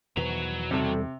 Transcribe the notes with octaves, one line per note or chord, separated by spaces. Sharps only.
E2 B2 D#3 F#4 B4 A#5
C3 G3 A4